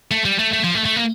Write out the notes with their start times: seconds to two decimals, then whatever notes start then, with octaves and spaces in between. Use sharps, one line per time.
0.11 A3
0.25 G3
0.39 A3
0.53 A3
0.64 F3
0.75 A3
0.85 A3
0.96 A#3